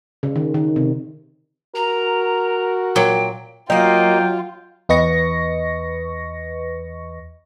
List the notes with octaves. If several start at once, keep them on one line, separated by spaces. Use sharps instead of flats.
C#3
D#3
D#3
C3
F#4 A#4 A#5
A#2 F#3 G5
F#3 A#3 D#4 F4 G5
E2 B4 D#5 C#6 A#6 C#7